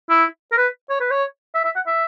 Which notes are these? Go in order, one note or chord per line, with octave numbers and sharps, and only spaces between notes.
E4
A#4
B4
C#5
B4
C#5
E5
E5
F#5
E5